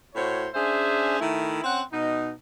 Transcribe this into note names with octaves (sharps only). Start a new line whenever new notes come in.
A2 F#4 C5 C#5
C#4 D4 G#4 C5 E5
D#3 A3 E4
C4 C#4 F#5
B2 D#4